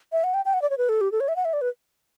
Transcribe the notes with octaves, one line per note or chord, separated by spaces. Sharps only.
E5
F#5
G5
G5
F#5
D5
C#5
B4
A4
G4
A4
C#5
E5
F#5
E5
D5
B4